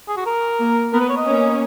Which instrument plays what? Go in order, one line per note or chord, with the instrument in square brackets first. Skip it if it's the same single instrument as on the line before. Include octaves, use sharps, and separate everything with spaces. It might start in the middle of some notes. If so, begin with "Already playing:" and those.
[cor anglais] G#4
F#4
A#4
[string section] A#3
[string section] B3 [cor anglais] A#4
[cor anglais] B4
C#5
D#5
[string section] A#3 C#4